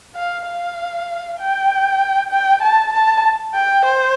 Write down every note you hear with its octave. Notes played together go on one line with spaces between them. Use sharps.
F5
F5
G5
G5
A5
A5
G5
C5